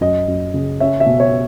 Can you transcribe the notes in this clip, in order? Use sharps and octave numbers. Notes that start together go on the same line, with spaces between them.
F#2 D#5
F#2
C#3
C#4 E5
E5
B2
C#5